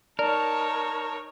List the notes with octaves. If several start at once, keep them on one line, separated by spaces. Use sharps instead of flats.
D#4 A#4 C#5 D5 A5